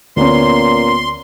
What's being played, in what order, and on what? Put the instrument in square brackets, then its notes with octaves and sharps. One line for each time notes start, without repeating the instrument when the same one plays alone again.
[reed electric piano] D2 [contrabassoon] A#2 [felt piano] B3 C#4 [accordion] C6